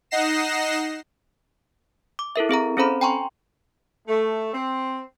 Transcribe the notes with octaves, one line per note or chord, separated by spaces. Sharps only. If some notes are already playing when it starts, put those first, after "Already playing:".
D#4 D#5 F#5 A#6 C7 E7
D6
E4 A4 A#4 E5
C4 G#4 E5 A#5
C4 C#4 A4 C5 A#5 B5
G5 G#5 A#5 C6 C#6
A3
C4